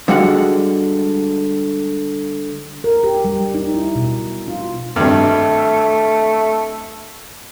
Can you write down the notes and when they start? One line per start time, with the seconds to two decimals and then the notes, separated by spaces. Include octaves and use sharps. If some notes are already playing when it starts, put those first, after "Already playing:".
0.08 D3 G3 G#3 F#4 F#5
2.84 A#4
3.03 G4
3.25 G3
3.54 D#4
3.75 E4
3.96 B2
4.48 F4
4.96 G#1 G2 A3